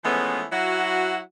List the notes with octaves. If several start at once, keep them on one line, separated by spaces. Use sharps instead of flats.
E3 F3 G#3 A3 B3 C#4
F#3 E4 F#4